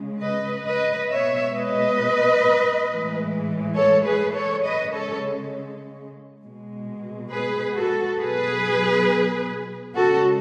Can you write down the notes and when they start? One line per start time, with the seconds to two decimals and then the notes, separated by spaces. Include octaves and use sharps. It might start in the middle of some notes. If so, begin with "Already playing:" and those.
Already playing: C#3 G#3
0.21 B4 D#5
0.66 B4 D#5
1.09 B2 G#3 C#5 E5
1.54 B4 D#5
2.87 A2 E3 G#3
3.75 A4 C#5
4.05 G#4 B4
4.34 A4 C#5
4.64 C#3 G#3 B4 D#5
4.94 A4 C#5
6.41 B2 G#3
7.30 G#4 B4
7.74 F#4 A4
8.19 B2 F#3 G#4 B4
9.96 C#3 G#3 F#4 A4